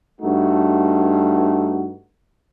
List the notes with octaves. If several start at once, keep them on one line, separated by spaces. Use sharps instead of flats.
G2 A3 D#4 F#4